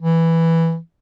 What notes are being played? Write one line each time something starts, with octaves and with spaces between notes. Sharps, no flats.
E3